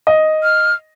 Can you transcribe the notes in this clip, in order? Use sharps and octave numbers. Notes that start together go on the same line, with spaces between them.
D#5
F6